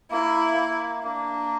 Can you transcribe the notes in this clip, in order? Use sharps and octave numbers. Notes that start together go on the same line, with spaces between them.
A#3 E4
A#3
A#3 D4